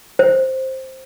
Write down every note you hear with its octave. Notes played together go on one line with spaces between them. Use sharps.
C5